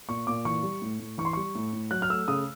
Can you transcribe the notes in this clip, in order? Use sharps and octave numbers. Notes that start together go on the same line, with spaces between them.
A#2 C#6
A#2 D6
E3 C#6
G3
A2
A2
E3 C#6
C6
G3 C#6
A2
A2
F#3 F#6
F6
A3 E6
C#3 D#6